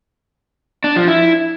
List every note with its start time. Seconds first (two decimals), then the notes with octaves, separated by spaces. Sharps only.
0.84 D4
0.96 F3
1.08 E4